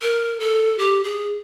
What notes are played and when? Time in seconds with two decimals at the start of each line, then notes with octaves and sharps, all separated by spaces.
0.02 A#4
0.40 A4
0.78 G4
1.04 G#4